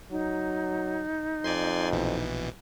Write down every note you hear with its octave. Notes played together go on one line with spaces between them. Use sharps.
F#3 D#4
F2 D5 G#5 C6
A#1 B2 E3